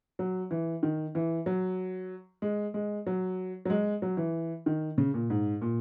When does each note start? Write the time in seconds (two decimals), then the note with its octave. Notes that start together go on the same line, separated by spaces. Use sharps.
0.19 F#3
0.51 E3
0.83 D#3
1.15 E3
1.46 F#3
2.42 G#3
2.74 G#3
3.06 F#3
3.65 F#3
3.70 G#3
4.02 F#3
4.17 E3
4.66 D#3
4.98 C#3
5.14 A#2
5.30 G#2
5.62 A#2